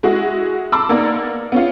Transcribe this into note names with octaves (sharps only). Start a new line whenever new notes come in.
G#3 E4 F#4 G#4
A5 B5 C6 D6 E6
A#3 B3 D#4 A#4 D5
B3 C#4 F4